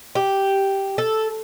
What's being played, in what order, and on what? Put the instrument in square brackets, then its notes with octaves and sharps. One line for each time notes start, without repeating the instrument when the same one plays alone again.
[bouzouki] G4
A4